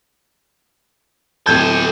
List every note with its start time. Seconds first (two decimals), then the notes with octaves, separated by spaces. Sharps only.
1.46 D1 G4 A4 G6 G#6